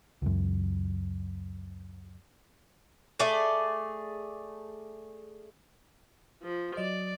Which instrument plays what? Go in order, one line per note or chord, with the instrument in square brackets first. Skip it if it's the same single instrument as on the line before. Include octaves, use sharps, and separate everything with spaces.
[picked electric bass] C#2 F#2
[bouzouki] A3 G#4 D5
[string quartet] F3
[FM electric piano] F#3 D#5 [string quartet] D5